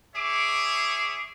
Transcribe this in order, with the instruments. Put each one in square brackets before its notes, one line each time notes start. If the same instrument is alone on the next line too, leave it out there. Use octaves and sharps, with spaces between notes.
[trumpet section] G#4 C#5 E5 D6